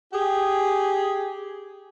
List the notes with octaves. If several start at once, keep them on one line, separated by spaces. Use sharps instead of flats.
G4 G#4